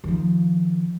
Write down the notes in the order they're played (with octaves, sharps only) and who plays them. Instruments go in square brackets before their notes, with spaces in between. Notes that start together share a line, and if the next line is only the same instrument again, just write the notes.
[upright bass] D#3 F3